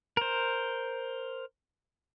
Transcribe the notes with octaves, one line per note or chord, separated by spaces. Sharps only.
A#4 C5